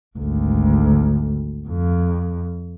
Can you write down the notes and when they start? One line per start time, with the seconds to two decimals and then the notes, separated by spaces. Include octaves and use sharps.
0.18 G#1 D2
1.68 F2